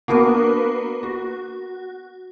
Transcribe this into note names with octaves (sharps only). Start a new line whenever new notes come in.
A#3 B3 D4 F#4 A#4 B4
F#4